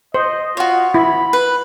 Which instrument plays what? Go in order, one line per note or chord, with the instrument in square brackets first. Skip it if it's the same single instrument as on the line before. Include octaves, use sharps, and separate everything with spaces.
[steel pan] C5 [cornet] D#5
[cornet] F4 [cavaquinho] F#4 C#5
[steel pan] E4 [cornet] B5
[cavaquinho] B4